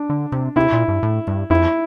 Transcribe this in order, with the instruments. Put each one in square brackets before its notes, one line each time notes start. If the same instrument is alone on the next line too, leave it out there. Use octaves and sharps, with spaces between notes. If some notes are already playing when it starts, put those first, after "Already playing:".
Already playing: [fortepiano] D4
[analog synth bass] D3
C3
[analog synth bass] C3 [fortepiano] E4
[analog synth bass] A#2
G2
A2
G2
[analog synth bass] F2 [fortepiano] E4